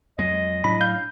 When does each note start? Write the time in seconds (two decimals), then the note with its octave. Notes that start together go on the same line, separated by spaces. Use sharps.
0.18 F2 F#3 G#3 D#5
0.64 A2 F#3 D4 B5
0.81 F5 G6